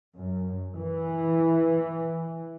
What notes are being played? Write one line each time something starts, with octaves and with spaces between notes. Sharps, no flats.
F#2
E3